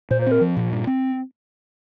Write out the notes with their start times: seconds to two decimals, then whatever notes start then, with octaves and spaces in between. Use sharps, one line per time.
0.11 A#2 C5
0.22 C4 C5
0.32 A#4
0.41 F3
0.57 A#2
0.72 G2
0.87 C4